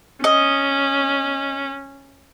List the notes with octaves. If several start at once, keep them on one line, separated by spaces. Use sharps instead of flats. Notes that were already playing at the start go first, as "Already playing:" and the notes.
C#4 D#5